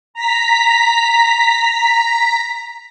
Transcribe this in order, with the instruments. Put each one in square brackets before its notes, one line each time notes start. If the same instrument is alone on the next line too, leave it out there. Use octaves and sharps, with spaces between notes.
[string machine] A#5 B6